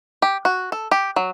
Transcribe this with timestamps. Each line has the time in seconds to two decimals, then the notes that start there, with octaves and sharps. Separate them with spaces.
0.22 G4
0.45 F#4
0.72 A4
0.91 G4
1.16 F#3